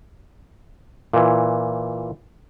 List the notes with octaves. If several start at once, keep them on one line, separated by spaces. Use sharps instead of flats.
A#2 E3